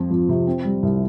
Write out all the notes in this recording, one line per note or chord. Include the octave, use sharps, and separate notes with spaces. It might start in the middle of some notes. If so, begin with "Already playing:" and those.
Already playing: F2 F3
F2
C3
C4
G3
C2